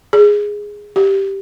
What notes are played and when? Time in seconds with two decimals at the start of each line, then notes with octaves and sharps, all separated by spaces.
0.13 G#4
0.96 G4